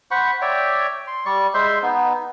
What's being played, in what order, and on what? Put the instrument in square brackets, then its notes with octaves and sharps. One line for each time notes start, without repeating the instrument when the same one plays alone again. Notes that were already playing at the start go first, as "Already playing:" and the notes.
[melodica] C5 F#5 B5 C#6
C#5 D5 E5 G5
C6
G3 D5 C#6
G#3 C5 E5 C6
B3 D#4